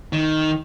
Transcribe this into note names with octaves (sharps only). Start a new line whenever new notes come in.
D#3